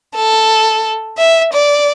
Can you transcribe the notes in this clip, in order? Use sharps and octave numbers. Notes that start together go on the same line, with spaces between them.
A4
E5
D5